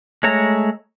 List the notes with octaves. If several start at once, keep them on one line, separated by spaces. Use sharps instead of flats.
G#3 A3 C#5 E5 A#5